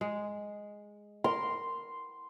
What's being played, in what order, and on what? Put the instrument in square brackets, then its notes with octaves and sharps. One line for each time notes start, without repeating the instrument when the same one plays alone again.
[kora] G#3
[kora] A#4 [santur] C6